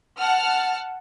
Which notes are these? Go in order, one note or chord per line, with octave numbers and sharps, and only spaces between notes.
F#5 A5 F6